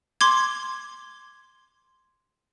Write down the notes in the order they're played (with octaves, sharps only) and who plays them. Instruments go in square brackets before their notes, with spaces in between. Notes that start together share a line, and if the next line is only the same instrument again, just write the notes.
[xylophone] C6 D6 G#6